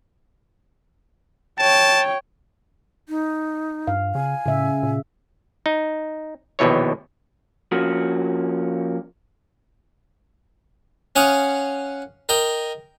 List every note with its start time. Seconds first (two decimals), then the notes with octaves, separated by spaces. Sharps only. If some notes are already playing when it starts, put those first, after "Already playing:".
1.59 C#5 G5 A5
3.09 D#4
3.87 G2 F5
4.15 C#3 G#5
4.46 A2 C#3 E5
4.83 A#2
5.66 D#4
6.59 A#1 D#2 B2 E3 C#5
7.72 F3 A#3 C#4 F#4
11.16 C#4 F5 F#5 D#6
12.29 A#4 D#5 G5